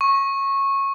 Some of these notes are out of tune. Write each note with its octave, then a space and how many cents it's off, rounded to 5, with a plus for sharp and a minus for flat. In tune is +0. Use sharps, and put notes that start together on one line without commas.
C#6 -20